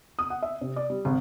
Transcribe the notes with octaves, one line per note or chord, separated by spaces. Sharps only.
D#6
F#5
E5
C3
D5
G3
G#1